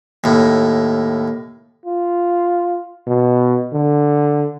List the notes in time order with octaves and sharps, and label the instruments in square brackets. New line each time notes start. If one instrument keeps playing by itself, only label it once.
[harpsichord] D#2 A2
[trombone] F4
B2
D3